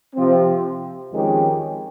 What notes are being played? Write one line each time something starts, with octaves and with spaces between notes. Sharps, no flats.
C3 F3 C4
F2 D#3 G#3 C#4 G4